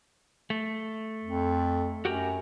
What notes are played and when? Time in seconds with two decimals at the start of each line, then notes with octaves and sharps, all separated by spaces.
0.50 A3
1.23 F2
2.05 F#2 F#4 G4 A#4